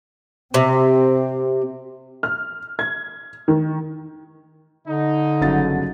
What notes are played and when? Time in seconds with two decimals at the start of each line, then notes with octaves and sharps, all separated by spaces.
0.54 C3 C4
2.23 F6
2.79 G#6
3.48 D#3
4.88 D3 D#4
5.41 G1 C#3 F#3 A6